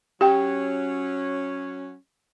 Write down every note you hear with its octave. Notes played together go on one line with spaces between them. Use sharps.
F#3 C#4 G4 G5